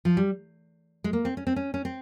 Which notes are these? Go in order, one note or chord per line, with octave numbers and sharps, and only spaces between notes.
F3
G3
G#3
A#3
C4
C#4
C4
C#4
C#4
C4